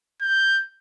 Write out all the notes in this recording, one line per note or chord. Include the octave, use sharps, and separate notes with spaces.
G6